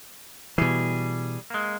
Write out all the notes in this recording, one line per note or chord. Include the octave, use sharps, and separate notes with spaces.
B2 E3 G3 G#4
G#3 A#3